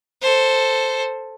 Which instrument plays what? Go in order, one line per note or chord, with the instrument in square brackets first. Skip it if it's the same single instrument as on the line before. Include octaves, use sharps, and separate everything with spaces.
[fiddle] A4 C5